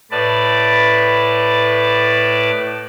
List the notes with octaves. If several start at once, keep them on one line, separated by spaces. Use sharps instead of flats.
A2 B4 D5 A5